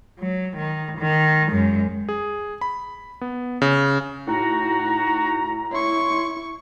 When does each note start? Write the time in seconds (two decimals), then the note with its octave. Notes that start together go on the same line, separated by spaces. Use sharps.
0.19 F#3
0.57 D#3
0.98 D#3
1.50 F#2 G#3
2.09 G#4
2.61 B5
3.21 B3
3.62 C#3
4.27 A2 D#4 F#4 A#5
5.72 E4 C#5 C6 C#6